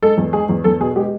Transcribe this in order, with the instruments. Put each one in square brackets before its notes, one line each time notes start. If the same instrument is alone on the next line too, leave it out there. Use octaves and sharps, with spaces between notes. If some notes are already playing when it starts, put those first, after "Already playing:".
[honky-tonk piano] G#3 A4
E2
G#3 G#4
E2
E2 A4
B2 G#4
G#3 G4